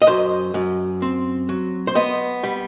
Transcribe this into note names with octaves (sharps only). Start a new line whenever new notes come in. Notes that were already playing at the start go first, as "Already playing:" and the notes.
D#5
F#2 C5
F#2
C4
F#3
C5
B3 D#5
G3